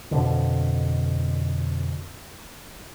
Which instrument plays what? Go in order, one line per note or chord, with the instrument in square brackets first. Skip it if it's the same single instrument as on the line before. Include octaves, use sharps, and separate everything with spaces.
[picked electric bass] F2 B2 D3